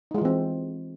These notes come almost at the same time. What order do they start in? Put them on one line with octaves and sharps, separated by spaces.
D#4 G#3 F4 E3 C4